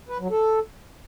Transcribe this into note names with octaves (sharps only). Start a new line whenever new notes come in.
B4
F#3
A4